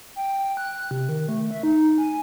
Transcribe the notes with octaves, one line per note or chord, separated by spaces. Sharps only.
G5
F#6
C3
D#3
A3
E5
D#4
G#5